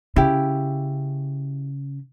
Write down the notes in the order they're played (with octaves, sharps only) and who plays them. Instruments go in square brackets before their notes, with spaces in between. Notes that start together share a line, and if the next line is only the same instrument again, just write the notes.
[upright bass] C#3 [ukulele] E4 G4